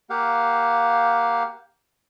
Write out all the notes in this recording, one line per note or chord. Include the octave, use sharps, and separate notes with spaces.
A#3 G4 F5 F#5